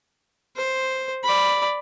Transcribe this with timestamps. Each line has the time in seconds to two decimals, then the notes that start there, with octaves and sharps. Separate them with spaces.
0.56 C5
1.24 D5 B5